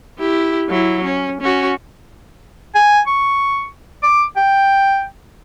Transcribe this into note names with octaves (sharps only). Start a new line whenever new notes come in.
E4 G4
F#3 E4
C#4
C#4 F#4
G#5
C#6
D6
G5